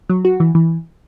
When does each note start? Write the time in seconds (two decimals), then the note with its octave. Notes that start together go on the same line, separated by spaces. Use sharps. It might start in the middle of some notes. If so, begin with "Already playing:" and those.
0.09 F#3
0.25 F#4
0.40 E3
0.55 E3